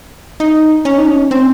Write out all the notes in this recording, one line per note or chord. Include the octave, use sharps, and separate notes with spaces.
D#4
C#4
D#4
C#4
C4